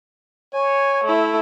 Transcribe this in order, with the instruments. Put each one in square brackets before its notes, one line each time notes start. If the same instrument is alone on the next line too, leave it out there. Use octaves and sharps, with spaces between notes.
[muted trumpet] C#5 [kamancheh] G#5
[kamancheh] A3 E4